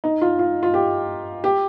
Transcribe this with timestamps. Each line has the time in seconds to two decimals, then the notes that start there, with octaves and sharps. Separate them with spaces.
0.04 D#4
0.21 F4
0.39 F4
0.63 F4
0.74 G4
1.44 G4